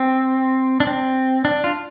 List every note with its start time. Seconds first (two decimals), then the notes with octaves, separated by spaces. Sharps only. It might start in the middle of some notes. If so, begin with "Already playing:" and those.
Already playing: C4
0.80 D4
0.87 C4
1.45 D4
1.64 F4